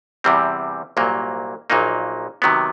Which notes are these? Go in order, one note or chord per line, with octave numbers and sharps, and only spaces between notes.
E2 C3 E3 G3 C4
C2 A#2 F#3 A#3
A#1 A#2 F#3 A#3 D#4
C3 D#3 F#3 B3